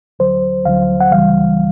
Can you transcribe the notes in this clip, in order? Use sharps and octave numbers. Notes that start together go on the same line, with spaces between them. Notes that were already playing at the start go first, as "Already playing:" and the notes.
D2 D3 F#3 C5
D2 D3 F#3 F5
F#5
C#2 C#3 E3 G3 F5